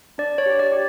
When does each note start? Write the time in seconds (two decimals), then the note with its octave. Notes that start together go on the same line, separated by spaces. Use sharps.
0.18 D4 D5
0.38 C#5
0.46 G4
0.59 D5
0.72 G4